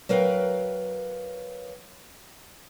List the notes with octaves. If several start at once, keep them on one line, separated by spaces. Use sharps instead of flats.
F#3 A#4 B4 F5 G5